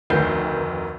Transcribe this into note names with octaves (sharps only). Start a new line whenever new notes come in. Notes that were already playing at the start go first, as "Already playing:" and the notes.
F1 D2 D#3 B4 G6 C7